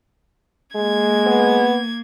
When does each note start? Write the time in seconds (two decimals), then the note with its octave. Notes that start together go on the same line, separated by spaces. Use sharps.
0.75 G#3 A#3 G#6
1.26 B3